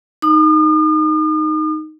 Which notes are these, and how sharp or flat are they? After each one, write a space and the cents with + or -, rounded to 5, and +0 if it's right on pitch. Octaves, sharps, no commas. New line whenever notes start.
D#4 +0 D#6 -45